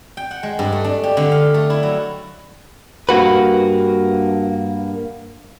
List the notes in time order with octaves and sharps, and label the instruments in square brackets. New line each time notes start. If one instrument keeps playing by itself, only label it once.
[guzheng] G5
F#5
G#3
G2
A3
D4
G4
D3
F5
A3
E4
F#3
[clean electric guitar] G2 A#3 F#4 B4